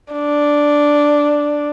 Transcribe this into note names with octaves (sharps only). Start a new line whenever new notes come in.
D4